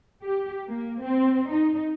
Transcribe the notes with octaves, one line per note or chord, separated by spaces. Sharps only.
G4
A#3
C4
D#4